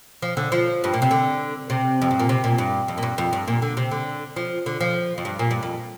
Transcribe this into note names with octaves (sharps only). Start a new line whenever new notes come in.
F3
D3
F3
G2
A#2
C3
D3
C3
F2
G2
A#2
C3
A#2
G2
F2
A#2
G2
F2
G2
A#2
D3
C3
D3
F3
D3
F3
F2
G2
A#2
G2
F2